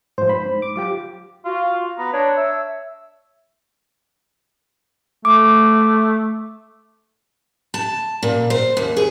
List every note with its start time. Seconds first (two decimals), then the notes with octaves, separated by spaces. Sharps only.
0.18 G#2 F3 C5
0.29 C5 B5
0.46 G#2
0.62 D6
0.76 F#3 F4 G4 D6
1.45 F4 F#4
1.98 B3 A#5
2.13 D4 C#5
2.37 E5
5.25 A3 D6
7.74 A5
8.23 A#2
8.50 C5
8.77 D#2
8.97 G#4